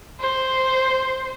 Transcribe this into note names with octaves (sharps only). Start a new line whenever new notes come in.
C5